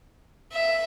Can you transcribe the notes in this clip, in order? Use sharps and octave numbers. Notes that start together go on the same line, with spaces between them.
E5